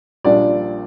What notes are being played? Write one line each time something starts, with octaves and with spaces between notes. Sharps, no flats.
A#1 A#2 G3 D4 D5